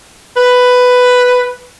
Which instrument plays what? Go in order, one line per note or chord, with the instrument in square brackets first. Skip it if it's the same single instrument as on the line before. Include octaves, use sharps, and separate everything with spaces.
[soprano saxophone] B4